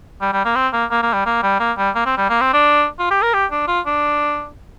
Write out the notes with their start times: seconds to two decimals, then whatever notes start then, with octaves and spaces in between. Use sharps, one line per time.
0.21 G3
0.33 G3
0.45 A#3
0.56 C4
0.73 A#3
0.91 A#3
1.02 A#3
1.14 G3
1.26 A#3
1.43 G3
1.60 A#3
1.78 G3
1.95 A#3
2.06 C4
2.18 G3
2.30 A#3
2.41 C4
2.53 D4
2.99 F4
3.11 G4
3.22 A#4
3.34 G4
3.51 D4
3.68 F4
3.86 D4